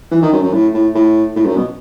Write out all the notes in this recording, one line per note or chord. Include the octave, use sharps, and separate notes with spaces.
E3
D#3
F#2
F#2
A2
A2
A2
A2
F#2
B2